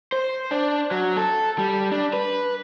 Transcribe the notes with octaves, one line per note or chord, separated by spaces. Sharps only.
C5
D4
F#3
A4
G3
D4
B4